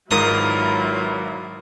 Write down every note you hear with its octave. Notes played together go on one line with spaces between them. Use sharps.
G#1 G#2 F#3 E4 F4 A#4 B4 D#6